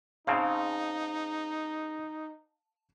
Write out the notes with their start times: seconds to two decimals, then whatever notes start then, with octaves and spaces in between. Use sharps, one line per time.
0.27 C#3 C4 D#4 F5 A5 C#7